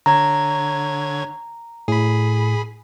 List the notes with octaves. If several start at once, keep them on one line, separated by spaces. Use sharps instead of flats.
D3 C#5 A#5 G#6
A2 G#4 B5